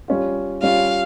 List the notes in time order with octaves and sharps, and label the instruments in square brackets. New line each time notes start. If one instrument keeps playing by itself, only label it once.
[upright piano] G3 C#4 F4
[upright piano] G3 C#4 F4 [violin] F5